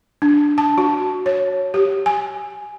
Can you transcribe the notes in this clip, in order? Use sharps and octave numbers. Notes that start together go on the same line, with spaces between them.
D4
A5
F#4
C#5
G4
G#5